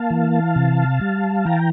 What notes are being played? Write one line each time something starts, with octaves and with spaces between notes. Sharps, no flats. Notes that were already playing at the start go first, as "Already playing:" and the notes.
Already playing: A#3 F5 A5
E3
C3
G3
E3 G5 A#5